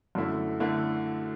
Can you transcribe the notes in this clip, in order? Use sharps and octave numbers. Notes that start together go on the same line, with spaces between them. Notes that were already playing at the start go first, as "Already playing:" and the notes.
F#2 D3 A3 E4
D3 A3 E4